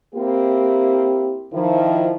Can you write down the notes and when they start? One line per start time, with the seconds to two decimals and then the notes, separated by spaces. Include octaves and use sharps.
0.15 A#3 C4 E4 G4
1.54 D#3 F3 E4